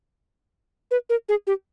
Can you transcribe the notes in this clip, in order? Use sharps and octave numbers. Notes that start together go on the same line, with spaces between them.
B4
A#4
G#4
G4